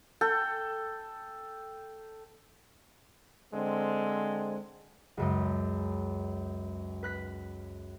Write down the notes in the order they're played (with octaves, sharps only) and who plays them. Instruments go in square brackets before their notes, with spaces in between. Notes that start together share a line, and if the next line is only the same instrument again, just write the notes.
[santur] A4 [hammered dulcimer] G5
[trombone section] D3 G#3 C4
[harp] C#2 F#2 G#3
B4 F#6 B6